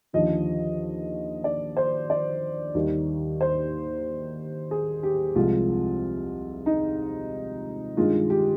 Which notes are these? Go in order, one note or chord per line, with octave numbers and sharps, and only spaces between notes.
D#2 D3 F3 D#5
D5
C5
D5
D#2 D#3 G3
C5
G#4
G4
C2 C3 F3 G#3 F4
D#4
G2 D#3 G#3 F4
G4